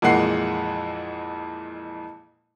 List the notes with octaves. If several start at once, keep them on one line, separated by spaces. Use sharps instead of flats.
F2 A#2 E3 G#3 F#5 C7